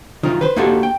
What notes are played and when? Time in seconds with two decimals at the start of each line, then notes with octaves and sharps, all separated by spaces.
0.23 D#3 F#3 D#4 F4
0.41 B4 C5
0.56 A#3 D#4 F#4 G4 A4
0.83 G5